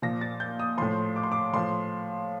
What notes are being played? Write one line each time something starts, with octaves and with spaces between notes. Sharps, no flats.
A#2 F3 A#6
A6
G6
D#6
A2 F3 C6
D6
C6
D6
A2 F3 C6